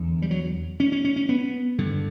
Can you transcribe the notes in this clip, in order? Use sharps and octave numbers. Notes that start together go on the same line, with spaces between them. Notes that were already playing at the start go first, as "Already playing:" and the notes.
Already playing: E2 D3
G3
F#3
C#4
C#4
C#4
C#4
B3
G2 D3